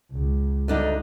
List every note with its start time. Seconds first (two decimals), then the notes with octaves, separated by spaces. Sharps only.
0.11 C#2
0.68 D2 D4 D#4